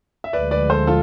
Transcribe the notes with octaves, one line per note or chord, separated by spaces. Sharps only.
E5
D2 D3 F3 G#3 B4 D5
B4 D5
A4 C5
F4 A4